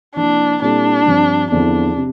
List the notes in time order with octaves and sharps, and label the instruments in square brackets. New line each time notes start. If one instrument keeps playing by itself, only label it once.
[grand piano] C3 F3 A#3 E4 [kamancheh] D4
[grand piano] A#2 G3 C4 E4 A4 [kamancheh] D4
[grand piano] G2 F3 C4
[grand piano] E2 D3 F3 C4 E4 [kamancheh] D4
[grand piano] C3